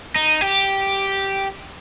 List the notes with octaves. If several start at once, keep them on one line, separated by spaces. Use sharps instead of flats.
D#4
G4